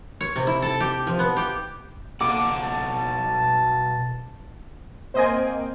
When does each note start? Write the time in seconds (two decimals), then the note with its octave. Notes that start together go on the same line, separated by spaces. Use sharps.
0.21 C#5
0.36 C3
0.47 E4
0.62 A4
0.80 G4
1.07 F3
1.19 B3
1.37 G4
2.21 B2 A#3 A4 F#5 D6
2.63 A5
5.14 A#3 C4 C5 D#5 G#5